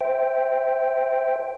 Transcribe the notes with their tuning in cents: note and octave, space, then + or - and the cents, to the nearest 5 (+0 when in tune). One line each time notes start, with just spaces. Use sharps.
C5 +0 E5 +0 G5 +0